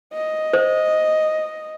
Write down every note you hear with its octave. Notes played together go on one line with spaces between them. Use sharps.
D#5
C5